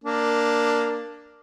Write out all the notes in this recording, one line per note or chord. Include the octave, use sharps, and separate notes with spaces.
A#3 D4